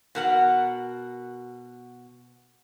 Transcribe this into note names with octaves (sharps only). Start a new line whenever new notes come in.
B2 A#4 F#5